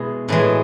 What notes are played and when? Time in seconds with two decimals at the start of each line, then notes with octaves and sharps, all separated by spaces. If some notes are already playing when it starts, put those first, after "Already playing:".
Already playing: B2 G#3 E4 G#4
0.28 A2 E3 G#3